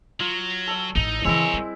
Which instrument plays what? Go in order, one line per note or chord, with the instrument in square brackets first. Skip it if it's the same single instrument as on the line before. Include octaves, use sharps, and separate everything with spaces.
[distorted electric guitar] F#3 [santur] F4
[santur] A4 E6
[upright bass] A1 E4 [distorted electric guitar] D#4
[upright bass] C#3 E3 [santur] G#3 C4 E4 [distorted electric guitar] A#4 C#5
[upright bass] G3